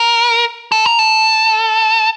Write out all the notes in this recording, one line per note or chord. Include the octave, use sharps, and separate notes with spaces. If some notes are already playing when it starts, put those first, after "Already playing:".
Already playing: A#4
A4
A#4
A4